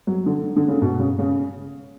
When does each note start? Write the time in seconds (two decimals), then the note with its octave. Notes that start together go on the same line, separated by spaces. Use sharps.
0.07 F#3
0.26 D3
0.56 D3
0.68 C#3
0.82 B2
0.99 C#3
1.19 C#3